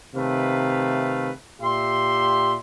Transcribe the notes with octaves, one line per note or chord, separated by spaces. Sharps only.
C3 D#3 A3 B4 F5
A#2 G4 E5 C6